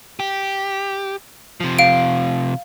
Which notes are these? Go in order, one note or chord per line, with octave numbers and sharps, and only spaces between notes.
G4
C3 F3
F5 D7